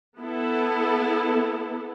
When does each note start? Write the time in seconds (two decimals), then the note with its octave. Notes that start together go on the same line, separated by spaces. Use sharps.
0.19 B3 E4 A4